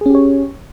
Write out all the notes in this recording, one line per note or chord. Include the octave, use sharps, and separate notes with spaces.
C#4 G4 G#4 C#5